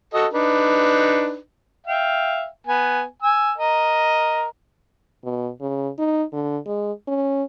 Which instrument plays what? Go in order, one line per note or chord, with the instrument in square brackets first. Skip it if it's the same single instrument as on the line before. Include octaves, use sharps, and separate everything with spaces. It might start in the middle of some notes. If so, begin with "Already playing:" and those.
[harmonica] F#4 A4 D#5
D4 D#4 B4
E5 F5 G5
B3 G#5
G#5 E6
A#4 D#5
[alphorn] B2
C#3
D#4
D3
G#3
C#4